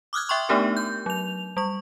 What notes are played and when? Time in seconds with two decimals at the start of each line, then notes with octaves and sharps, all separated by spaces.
0.13 D6 D#6 F6 F#6 G#6
0.29 E5 G5 C6 C#6
0.49 A3 B3 D4 D#4 G4 A#4
0.77 G6
1.06 F#3 F7
1.57 G3 C#6